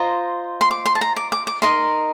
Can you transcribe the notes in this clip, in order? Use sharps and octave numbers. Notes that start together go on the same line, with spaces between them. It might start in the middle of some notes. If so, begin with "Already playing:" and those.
Already playing: F4 C5 D#5 A#5
C6
D6
C6
A5
A#5
D6
D6
D6
D#4 A#4 D#5 C6